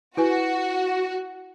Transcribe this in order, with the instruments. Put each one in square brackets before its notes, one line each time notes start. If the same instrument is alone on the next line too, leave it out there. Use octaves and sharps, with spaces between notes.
[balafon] E4 B4 G#5 [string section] F#4